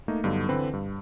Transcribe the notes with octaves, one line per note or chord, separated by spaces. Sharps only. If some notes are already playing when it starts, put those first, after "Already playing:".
A3 A#3 D#4
G2 D3 F#3 B3 D#4
D3 E3 C4 B4
G2